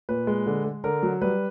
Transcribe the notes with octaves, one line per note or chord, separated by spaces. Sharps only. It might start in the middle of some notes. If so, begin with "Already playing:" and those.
A#2 B4
G#3
D3
G#3
D3 A#4
F#3
G3 B4